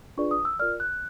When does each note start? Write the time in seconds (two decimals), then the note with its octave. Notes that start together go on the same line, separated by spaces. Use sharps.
0.17 D4 F4 G#4 B4 D5 C#6
0.31 D#6
0.45 E6
0.59 F4 A#4 D5 F6
0.80 F#6